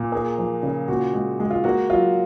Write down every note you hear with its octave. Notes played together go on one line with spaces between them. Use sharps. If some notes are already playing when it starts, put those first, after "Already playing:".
Already playing: A#2
A#3 G#4
F3
C#3
A#2 F#4
G#3
G#3
F4
A#3 F#4
F#3 F4